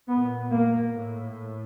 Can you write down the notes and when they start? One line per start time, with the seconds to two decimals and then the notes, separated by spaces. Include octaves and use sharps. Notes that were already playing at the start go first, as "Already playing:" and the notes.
0.08 A#2 B3
0.52 A#3
0.96 A2